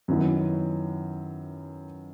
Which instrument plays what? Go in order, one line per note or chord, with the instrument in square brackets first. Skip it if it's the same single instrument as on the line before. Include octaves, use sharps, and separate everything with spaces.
[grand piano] F#2 D#3 F#3 B3 E4